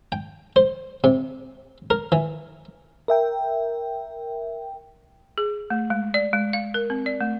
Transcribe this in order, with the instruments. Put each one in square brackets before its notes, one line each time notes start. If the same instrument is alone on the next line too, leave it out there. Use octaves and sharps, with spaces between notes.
[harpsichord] G5
C5
C3
A#4
E3
[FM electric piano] A#4 E5 G5
[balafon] G#4
A3
G#3
D5
G#3
F5
A#4
C4
D5
A3